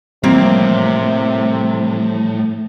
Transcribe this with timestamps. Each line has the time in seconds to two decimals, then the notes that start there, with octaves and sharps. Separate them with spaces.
0.24 A2 C3 E3 F3 G3 A#3 C4